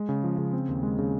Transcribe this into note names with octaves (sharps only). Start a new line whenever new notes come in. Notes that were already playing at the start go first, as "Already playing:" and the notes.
Already playing: G#3
C#3
F3
C#3
C4
D#2
G#3
C#3